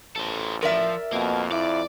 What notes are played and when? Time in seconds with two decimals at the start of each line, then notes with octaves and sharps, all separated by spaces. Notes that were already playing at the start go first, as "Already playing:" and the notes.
0.16 A1 A4 C5
0.63 F3 A#4 D5 E5
1.13 F2 B2 A#3
1.52 E4 D5